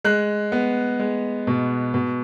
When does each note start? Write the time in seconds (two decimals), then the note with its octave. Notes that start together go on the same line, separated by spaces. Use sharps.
0.04 G#3 F#6
0.52 B3
0.99 G#3
1.47 B2
1.94 B2